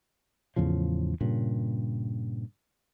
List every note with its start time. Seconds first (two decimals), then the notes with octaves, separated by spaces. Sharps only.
0.56 E2 A2 C#3 F3
1.21 G2 A#2 C#3